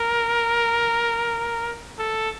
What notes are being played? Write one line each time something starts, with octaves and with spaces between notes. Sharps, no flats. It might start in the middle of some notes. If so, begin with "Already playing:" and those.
Already playing: A#4
A4